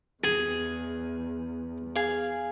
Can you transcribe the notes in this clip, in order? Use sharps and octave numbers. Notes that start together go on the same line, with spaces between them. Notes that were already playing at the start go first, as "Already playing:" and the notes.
E2 G#4
G#4 F5